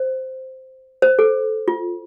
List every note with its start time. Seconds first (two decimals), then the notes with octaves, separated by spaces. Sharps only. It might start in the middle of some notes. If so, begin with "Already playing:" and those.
Already playing: C5
1.02 C5
1.19 A4
1.68 F4